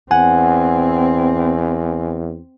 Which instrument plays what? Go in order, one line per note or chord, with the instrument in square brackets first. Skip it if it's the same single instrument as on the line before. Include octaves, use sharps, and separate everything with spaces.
[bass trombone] E2 [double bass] C4 [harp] F#5 [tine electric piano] G#5